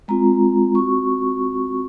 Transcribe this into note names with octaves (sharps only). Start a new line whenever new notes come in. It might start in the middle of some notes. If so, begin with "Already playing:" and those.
G#3 C4 F4 A#5
C4 F#4 C#6